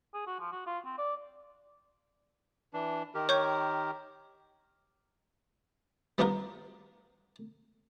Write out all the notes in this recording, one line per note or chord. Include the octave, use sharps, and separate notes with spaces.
G#4
F#4
F3
F#4
F4
C4
D5
E3 D4
D#3 G4 A#4
C#5 C#6 G6
G3 B3 D4 D#4 F4 A#4